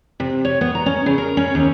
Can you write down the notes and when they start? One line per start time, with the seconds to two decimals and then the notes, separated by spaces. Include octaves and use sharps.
0.20 C3
0.45 C#5
0.61 B3
0.75 A#5
0.86 C#4
1.06 C#3
1.18 A#4
1.37 C#4
1.55 D#2